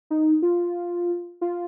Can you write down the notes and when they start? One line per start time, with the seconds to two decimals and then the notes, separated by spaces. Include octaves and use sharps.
0.10 D#4
0.42 F4
1.41 F4